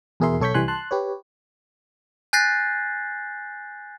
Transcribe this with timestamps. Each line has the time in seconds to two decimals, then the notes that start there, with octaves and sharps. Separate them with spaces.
0.20 E2 B2 G#4 A#4 E5 C6
0.41 B1 A4 C#5 C#6 G6 B6
0.54 C2 E3 G3 G#5 C6 F#6
0.68 A5 C6 F#6
0.91 G4 B4 C#5
2.33 G#5 F#6 G6 A6 A#6 C7